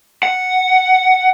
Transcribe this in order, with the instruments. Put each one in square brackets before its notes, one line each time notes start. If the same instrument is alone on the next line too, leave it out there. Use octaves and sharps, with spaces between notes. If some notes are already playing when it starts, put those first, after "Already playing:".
[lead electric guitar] F#5